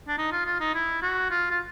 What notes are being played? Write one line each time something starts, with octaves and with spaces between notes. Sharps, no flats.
D4
D#4
F4
F4
D#4
E4
F#4
F4
F4